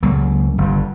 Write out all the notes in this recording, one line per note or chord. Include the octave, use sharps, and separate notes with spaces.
C#2 F#3 A#3
G1 G2